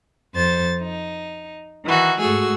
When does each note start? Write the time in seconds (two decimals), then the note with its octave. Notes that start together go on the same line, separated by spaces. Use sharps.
0.35 F2 C5 A6
0.80 D#4
1.86 D#3 E3 F#4
2.20 G#2 A3 F#4 G#4 E6